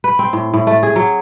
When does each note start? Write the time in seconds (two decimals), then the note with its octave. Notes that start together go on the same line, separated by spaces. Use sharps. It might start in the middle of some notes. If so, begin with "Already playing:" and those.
0.04 B4
0.19 C4
0.33 A2
0.54 A2
0.67 A3
0.83 G#4
0.96 F#3